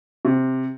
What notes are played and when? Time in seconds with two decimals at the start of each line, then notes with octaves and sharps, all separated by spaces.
0.25 C3